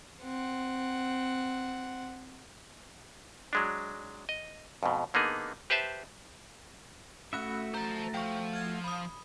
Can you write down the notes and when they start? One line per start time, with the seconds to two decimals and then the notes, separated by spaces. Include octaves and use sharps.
0.23 C4 F#5
3.53 F#3 G#3 D4
4.29 D#5
4.83 F2 G#2 B2
5.14 D3 A#3 B3 D#4 G#4
5.70 G4 B4 C5 E5 A5
7.33 A3 C#4 F#4 E5 B5 F#6
7.74 C5 A5 A#5
8.14 F3 G5 C#6
8.53 F6 G#6
8.84 B5 D#6